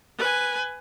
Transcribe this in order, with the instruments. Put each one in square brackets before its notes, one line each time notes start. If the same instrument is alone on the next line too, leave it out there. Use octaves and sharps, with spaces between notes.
[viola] B4 G#5